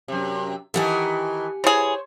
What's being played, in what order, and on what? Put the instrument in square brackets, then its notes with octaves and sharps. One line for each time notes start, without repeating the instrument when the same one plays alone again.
[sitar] F#2 C3
[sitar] D#3 E3 A4 [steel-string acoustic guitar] G4 F#5 G#5
[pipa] E3 G#4 [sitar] C5 C#5